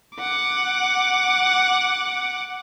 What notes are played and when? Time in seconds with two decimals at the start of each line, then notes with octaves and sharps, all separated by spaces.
0.16 F#5 D6